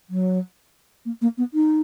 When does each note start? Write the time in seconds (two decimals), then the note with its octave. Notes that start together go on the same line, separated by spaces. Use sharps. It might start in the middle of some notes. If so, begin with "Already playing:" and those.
0.10 F#3
1.05 A#3
1.22 A#3
1.38 B3
1.54 D#4